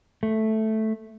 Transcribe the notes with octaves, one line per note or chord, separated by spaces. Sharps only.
A3